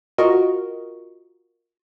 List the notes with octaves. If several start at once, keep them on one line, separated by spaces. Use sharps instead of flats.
F4 F#4 A#4 D#5 C#6